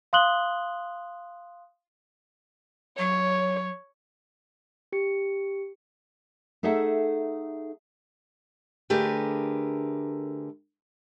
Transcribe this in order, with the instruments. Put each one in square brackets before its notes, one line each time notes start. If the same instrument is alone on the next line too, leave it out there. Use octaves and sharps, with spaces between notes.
[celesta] F5 C6 D#6 F#6 F#7 G7
[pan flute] F#3 [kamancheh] C#5
[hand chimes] G4 C#7
[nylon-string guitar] A3 D#4 G#4 A4 E5 F#5
[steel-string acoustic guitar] D3 A3 G4 G#4 A#4 B4